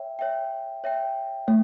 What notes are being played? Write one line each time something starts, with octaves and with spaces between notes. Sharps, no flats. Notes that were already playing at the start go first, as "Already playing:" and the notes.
Already playing: C#5 E5 G5
C#5 E5 G5
C#5 E5 G5
A3 C#5